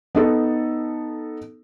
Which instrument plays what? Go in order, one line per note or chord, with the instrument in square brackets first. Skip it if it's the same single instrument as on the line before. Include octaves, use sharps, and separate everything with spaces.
[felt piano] B3 D#4 A4